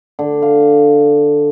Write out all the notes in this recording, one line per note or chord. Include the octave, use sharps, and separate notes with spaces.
D3
F5